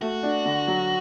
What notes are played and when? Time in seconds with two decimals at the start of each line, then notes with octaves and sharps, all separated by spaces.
0.01 A3 F#4
0.23 D4
0.45 D3
0.67 F#3